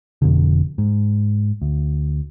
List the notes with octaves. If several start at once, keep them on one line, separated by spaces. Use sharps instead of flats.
F1 F2 B2 D3
G#2
D2